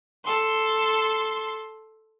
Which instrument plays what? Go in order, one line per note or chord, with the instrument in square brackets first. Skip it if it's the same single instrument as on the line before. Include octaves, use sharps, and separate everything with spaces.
[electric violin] A4 C6